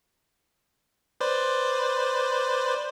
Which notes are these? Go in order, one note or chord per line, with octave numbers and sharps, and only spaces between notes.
B4 C5 D5